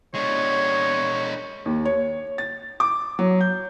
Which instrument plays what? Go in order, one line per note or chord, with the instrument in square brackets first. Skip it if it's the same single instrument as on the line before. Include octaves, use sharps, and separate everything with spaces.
[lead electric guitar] G#3 D4 [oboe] C#5
[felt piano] D#2
C#5
A6
D6
F#3
G6